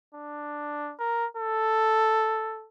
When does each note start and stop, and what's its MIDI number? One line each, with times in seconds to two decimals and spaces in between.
0.15 0.94 62
0.99 1.26 70
1.37 2.67 69